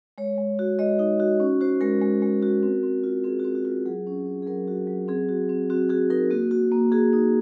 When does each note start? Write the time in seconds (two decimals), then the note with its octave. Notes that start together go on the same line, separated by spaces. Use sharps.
0.18 G#3 C#5
0.38 G#3
0.59 F#4
0.79 G#3 D#5
0.99 D#4
1.20 F#4
1.40 C#4
1.61 F#4 C5
1.81 G#3 A#4
2.02 G#3
2.22 G#3
2.43 F#4
2.63 C4
2.83 C4
3.04 F4
3.24 C4 G#4
3.39 F#4
3.44 C4
3.55 F#4
3.65 F4
3.86 F#3 G#4
4.07 C#4
4.26 C#4
4.42 G#4
4.47 F#3 A#4
4.68 F#4
4.87 F#3
5.08 C4 G#4
5.29 F#4
5.49 C4
5.70 C4 F#4
5.89 F#4 G#4
6.10 D#4 A#4
6.31 A#3 F#4
6.51 F#4
6.72 A#3
6.92 F#4 G#4
7.13 D#4